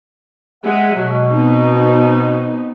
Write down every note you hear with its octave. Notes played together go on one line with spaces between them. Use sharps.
G#3 E5 F#5
B2 F#3
B3 C4 D#4